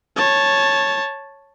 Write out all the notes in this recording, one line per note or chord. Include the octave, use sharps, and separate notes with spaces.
C#5 A5